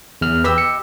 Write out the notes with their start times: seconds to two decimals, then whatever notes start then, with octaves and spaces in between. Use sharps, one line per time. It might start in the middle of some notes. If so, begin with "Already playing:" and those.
0.21 E2 F6
0.44 G4 B4 D#5 E6
0.58 C#7